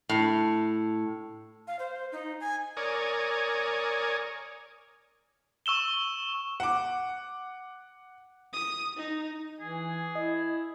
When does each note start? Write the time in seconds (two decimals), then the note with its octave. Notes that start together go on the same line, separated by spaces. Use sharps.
0.09 A2
1.67 F5
1.79 C5
2.12 D#4
2.41 G#5
2.77 A#4 C#5 D5 G#5 D#6
5.66 C#6 E6 E7 G7
6.60 F#5 D6
8.53 D#6
8.97 D#4
9.61 E3 G#4
10.15 E4 D#5